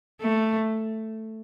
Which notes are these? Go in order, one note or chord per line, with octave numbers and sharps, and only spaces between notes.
A3